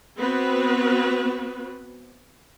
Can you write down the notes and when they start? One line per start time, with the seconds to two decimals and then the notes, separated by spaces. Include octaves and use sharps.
0.19 B3 C4 F#4 B4